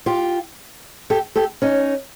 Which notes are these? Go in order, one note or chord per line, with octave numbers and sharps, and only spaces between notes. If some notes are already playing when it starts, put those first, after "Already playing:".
F4 G4
G4 A4
G4 A4
C#4 D#4